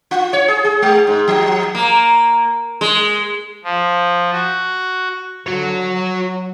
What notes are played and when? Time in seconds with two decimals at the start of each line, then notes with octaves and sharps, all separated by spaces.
0.11 F4
0.33 C#5
0.48 G#4
0.65 G#4
0.82 G#3
1.07 G#2
1.28 F3
1.75 A#3
2.81 G#3
3.64 F3
4.32 F#4
5.46 D3 F#4 C#5
5.90 F#3